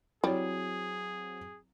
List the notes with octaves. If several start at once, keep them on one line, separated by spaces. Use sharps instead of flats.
F#3 G3 C4 E4 G#4 C#5